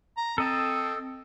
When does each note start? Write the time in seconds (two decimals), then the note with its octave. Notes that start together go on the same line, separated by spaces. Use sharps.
0.17 A#5
0.38 C4 A4 D#5 A5